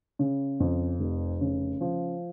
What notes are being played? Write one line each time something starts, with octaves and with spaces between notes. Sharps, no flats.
C#3
F2
F1
C#3
F3